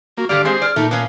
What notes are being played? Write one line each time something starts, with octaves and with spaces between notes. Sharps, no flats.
A#3 F#4
G2 D3 G4 D5 F5
G#3 C4 G#4 C5 D#5
D5 F6
A#2 A3 D#4
B3 C#4 F5